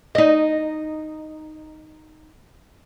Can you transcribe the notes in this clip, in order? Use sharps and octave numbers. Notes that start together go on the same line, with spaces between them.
D#4 D#5